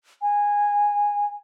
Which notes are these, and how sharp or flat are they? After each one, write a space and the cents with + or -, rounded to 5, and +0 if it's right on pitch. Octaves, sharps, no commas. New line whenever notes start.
G#5 -15